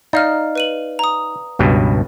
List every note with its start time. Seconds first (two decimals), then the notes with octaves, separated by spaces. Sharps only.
0.13 D#4 D5 F5 F6
0.55 B4 D#7 F#7
0.99 A#5 D#6
1.59 C#2 G2 B2